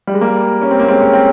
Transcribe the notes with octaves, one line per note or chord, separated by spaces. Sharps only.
G3
G#3
G3 A#3
C#4
C4
A#3
G#3 C4
C#4
C4